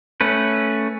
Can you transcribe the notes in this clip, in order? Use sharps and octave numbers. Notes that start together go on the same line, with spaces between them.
A3 C#4 B4